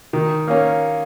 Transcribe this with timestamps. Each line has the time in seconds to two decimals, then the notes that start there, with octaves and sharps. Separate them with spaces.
0.13 D#3
0.48 A#3 C#4